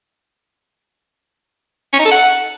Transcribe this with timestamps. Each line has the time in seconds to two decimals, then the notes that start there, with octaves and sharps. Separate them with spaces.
1.93 C#4
1.99 D#4
2.05 A4
2.11 F#5